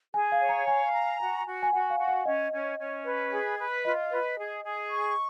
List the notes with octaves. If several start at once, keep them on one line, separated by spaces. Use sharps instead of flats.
G#4 G#5
F5
C#5
A#5
F5 G#5
A#5
F#4
F#4
G#5
F#4 F#5
F5
F#4
F#5
C#4 D#5
C#4
C#4
B4
G#4
B4
F4 D#5
B4
G#4
G#4
C#6